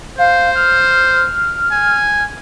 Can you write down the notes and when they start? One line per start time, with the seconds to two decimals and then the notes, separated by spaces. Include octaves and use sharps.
0.18 C5 F5
0.55 F6
1.71 G#5